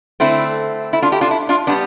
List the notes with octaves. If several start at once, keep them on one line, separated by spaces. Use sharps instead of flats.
D3 A3 C4 E4
E4
D4 F4
E4 G4
D4 F4
E4
D4 F4
G3 B3 D4